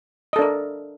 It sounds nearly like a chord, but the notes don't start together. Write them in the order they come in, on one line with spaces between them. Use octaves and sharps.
D#5 A4 D4 A#4